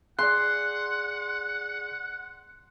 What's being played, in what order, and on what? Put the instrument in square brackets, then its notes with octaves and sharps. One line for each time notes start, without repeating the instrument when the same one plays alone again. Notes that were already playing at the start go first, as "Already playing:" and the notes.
[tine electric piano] G#4 D5 [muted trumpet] F#5 [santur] C6 [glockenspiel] F#6